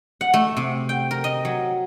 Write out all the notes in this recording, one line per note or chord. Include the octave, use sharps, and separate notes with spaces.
F#5
A3
C3
G5
A#4
D#5
F#3